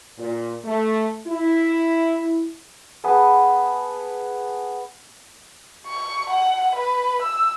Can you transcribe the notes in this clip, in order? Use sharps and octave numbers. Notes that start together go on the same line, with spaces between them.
A#2
A3
E4
B3 G#4 B4 A5
C#6
F#5
B4
E6